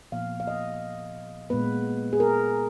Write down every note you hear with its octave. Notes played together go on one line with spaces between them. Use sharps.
A#2 F3 B3 F5
F5
D#5
A#2 G#3 B3 B4
G#4
A#4